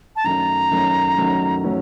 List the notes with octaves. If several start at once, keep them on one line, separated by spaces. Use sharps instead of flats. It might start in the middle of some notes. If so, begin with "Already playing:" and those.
A5
F#2 D#3 F#3 A3 C#4 A#5
F#2 D#3 F#3 A3 C#4
F#2 D#3 F#3 A3 C#4
F#3 A3 C#4